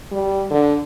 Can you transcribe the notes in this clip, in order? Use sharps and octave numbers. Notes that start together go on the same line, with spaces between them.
G3
D3